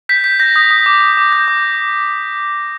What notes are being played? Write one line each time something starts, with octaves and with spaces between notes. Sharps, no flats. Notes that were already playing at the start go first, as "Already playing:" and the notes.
G6 B6
G6 B6
G6 A#6
D#6
D#6
D6
D6
D6
G6
D6